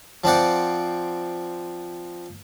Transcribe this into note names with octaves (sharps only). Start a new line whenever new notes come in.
F3 C4 D5 F#5